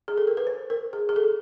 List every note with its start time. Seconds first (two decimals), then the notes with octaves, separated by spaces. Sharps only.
0.08 G#4
0.18 A4
0.27 A#4
0.37 B4
0.47 C5
0.70 A#4
0.93 G#4
1.09 G#4
1.16 A4